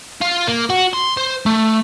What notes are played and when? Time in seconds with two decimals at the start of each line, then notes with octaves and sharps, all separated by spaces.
0.21 F4
0.47 A#3
0.70 F#4
0.94 C6
1.17 C5
1.46 A3